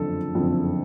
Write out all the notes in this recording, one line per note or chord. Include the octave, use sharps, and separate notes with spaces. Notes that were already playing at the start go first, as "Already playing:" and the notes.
Already playing: F#1 F2 D3 A4
F#1 F2 D3